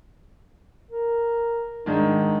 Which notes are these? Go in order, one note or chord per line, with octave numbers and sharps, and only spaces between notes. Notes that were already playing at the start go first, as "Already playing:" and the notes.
A#4
G#2 D#3 D4 D#4